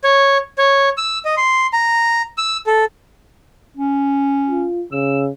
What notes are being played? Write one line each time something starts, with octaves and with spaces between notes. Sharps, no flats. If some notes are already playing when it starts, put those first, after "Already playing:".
C#5
C#5
E6
D#5
C6
A#5
E6
A4
C#4
F4
C#3 E6